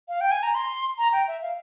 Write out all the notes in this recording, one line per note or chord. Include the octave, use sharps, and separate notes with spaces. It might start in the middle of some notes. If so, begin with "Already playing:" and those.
F5
G5
G#5
A#5
C6
A#5
G5
E5
F5